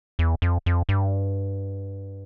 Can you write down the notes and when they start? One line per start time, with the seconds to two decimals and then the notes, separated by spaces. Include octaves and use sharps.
0.19 E2
0.42 F2
0.66 F2
0.89 G2